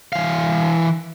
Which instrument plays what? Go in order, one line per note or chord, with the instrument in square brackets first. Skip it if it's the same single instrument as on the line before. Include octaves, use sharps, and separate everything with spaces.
[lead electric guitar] E3 F5